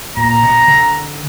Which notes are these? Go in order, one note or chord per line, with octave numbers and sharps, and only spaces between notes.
A#2 A#5
B2
D3